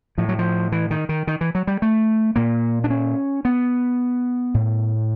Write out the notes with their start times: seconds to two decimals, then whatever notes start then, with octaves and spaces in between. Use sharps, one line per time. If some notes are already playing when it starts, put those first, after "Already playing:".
0.18 A2 F3
0.29 F#3
0.39 F3
0.72 E3
0.91 D#3
1.09 D#3
1.27 D#3
1.41 E3
1.55 F#3
1.67 G3
1.82 A3
2.36 A#2 A#3
2.84 D4
2.90 C#4
3.45 B3
4.54 A2